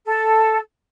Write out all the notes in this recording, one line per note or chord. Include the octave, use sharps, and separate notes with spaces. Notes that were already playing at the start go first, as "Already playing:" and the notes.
A4